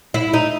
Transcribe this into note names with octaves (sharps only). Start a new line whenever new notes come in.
E4
D#4